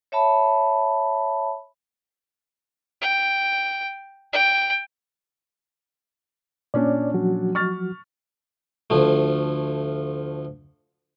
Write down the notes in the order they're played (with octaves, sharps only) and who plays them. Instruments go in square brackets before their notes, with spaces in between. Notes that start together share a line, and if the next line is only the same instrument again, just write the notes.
[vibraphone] C#5 E5 A5 B5
[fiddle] G5
G5
[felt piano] A#2 C#4 D4 [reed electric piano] C#5 D5
[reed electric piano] F3 F#3 F#4
[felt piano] C#6 F6 A6
[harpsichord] D2 F3 A3